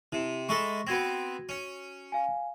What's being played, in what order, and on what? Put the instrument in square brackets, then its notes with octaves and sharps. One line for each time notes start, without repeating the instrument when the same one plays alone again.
[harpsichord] C3 [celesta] E4
[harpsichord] G#3 E4 A4 [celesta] C#6
[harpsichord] B3 C4 [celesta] F#4 G#6 A#6
[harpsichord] C#4
[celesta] F5 G#5